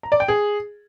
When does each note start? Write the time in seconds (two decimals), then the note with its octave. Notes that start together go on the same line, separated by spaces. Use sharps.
0.03 A#5
0.12 D5
0.20 G5
0.28 G#4